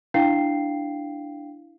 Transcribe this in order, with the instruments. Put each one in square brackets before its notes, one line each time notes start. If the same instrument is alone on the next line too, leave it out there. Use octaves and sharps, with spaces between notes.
[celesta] D4 E4 F5 G5 C7